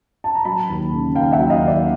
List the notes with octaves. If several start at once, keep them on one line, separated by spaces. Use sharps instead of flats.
A5
A#5
F#3 A5 B5
D#2
C#3
D#2 F5 G5
E5 F#5
F#3
D#5 F5
D#2
D5 E5